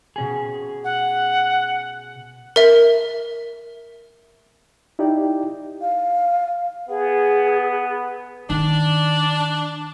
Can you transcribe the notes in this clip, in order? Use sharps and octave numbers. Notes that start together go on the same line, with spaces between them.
B2 C#4 G#4
F#5
A#4 E5
D#4 E4 G4 D5 G5
F5
B3 G#4
D#3 D4